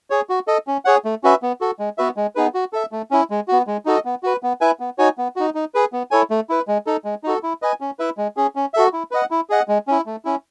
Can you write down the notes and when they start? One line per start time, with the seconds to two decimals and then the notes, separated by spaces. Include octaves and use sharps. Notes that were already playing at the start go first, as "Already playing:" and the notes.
0.10 G#4 C#5
0.29 F#4
0.48 A4 D#5
0.67 C#4
0.85 G#4 C#5 F#5
1.05 A3
1.24 C#4 F#4 B4 E5
1.42 B3
1.61 F#4 A4
1.79 G#3
1.98 B3 F#4 B4 E5
2.17 G#3
2.35 B3 D#4 G#4 B4
2.54 F#4
2.73 A4 E5
2.92 A3
3.11 C#4 E4
3.30 G#3
3.48 B3 F#4
3.67 G#3
3.86 D#4 F#4 A4 D#5
4.05 B3
4.23 F#4 B4
4.43 B3
4.61 E4 B4 E5 G#5
4.80 B3
4.98 D#4 F#4 C#5 G#5
5.18 B3
5.36 D#4 F#4
5.55 D#4
5.74 G#4 B4
5.93 B3
6.11 E4 A4 C#5 G#5
6.30 A3
6.50 E4 B4
6.68 G#3
6.87 D#4 A4
7.05 G#3
7.24 D#4 F#4 A4
7.43 E4
7.62 B4 D#5 G#5
7.81 C#4
7.99 E4 B4 E5
8.17 G#3
8.37 C#4 G#4
8.56 C#4
8.74 F#4 A4 E5
8.93 E4
9.11 B4 D#5 F#5
9.31 E4
9.50 G#4 D#5 F#5
9.68 G#3
9.88 C#4 E4
10.06 A3
10.25 C#4 E4